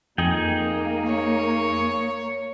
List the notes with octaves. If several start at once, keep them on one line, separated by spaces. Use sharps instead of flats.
F2 A#3 D#4 G#4 G5
C#5